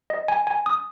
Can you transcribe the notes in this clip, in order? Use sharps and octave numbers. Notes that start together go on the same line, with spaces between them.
D#5
G#5
G#5
D#6